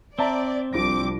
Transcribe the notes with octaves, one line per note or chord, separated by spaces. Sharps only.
C4 D5 E5 A5 A#5
C2 F3 D4 D6 A#6